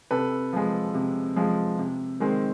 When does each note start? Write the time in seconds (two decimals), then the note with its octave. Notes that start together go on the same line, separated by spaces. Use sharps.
0.11 C3 A4 B4
0.53 F3 G#3
0.94 C3
1.36 F3 G#3
1.78 C3
2.20 D#3 G#3 C4